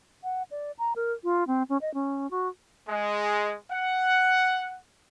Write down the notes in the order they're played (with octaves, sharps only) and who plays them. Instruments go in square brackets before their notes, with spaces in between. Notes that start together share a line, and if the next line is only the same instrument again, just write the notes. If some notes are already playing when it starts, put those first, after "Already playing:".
[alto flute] F#5
D5
A#5
A#4
F4
C4
C#4
D#5
C#4
F#4
[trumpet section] G#3
F#5